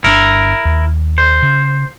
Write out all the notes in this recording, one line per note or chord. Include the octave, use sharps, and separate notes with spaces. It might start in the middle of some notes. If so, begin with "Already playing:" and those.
G1 C#3 D4 E4 A#4
D#2
C5
C#3